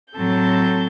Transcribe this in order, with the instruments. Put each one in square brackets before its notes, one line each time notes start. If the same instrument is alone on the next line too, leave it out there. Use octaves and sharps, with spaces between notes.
[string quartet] A2 F#3 C4 A4 A5 G6